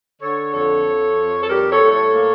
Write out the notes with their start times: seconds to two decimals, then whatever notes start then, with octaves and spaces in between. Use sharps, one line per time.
0.22 D3 A4 C#5
0.54 F2 A4 C#5
0.86 F3
1.18 F2
1.41 A4
1.49 G3 G4 A#4
1.71 A4 C#5
1.81 A2
1.91 A4 C#5
2.13 A#3